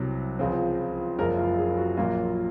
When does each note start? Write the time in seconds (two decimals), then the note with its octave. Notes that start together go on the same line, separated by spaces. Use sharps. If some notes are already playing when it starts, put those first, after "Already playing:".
Already playing: C2 C3 F#3
0.39 C#2 C#3 F3 C4
1.19 F#1 F#2 F3 G#3 A#4
1.38 F4
1.58 G#4
1.77 F#4
1.97 A#1 A#2 F#3 A#3 F4